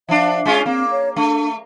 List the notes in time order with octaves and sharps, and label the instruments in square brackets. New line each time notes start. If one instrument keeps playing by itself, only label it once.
[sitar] F3 D4 [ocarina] E5
[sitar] G#3 C#4 F4
[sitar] A#3 [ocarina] C4
[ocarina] C#5
[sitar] A3 [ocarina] D4